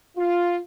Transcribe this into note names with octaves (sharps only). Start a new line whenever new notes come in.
F4